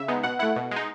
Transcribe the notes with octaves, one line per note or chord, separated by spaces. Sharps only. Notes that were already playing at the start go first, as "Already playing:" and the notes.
Already playing: C#3 E5
G#3 B3 D#4
B2 F#5
A3 E4 F#5
B2
G#3 D#4